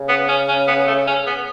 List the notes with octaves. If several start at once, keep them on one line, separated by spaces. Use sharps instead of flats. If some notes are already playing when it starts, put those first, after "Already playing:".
Already playing: C#3
B3
C#4
C#4
B3
A3
C#4
B3